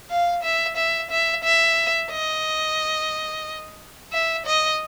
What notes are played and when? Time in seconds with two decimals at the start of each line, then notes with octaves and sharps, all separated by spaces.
0.10 F5
0.43 E5
0.77 E5
1.11 E5
1.44 E5
2.11 D#5
4.13 E5
4.46 D#5